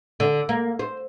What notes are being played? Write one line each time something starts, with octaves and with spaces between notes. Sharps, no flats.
D3
A#3
C5